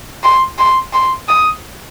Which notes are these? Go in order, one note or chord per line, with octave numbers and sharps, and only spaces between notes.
C6
C6
C6
D#6